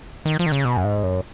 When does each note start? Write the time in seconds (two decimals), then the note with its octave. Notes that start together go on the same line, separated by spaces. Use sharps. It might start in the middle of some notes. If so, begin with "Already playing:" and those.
0.25 D#3
0.39 F3
0.46 D#3
0.52 C#3
0.65 B2
0.77 F#2
0.84 G#2
1.03 F#2